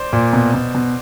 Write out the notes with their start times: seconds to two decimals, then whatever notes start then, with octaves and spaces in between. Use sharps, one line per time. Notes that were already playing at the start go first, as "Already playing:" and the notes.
Already playing: C5 D5
0.13 A#2
0.33 B2
0.54 B2
0.75 B2